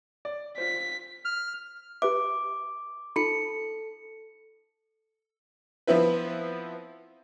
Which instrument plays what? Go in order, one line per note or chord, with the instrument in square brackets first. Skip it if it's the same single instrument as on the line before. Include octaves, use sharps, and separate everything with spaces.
[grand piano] D5
[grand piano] F4 C5 [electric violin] B6
[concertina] F6
[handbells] G4 B4 E5 [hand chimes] D6
[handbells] D#4 F4 B5 [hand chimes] A4 C#7
[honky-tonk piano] F3 B3 C4 E4 B4